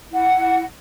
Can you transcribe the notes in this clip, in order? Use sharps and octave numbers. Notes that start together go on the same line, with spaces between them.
E4 F#5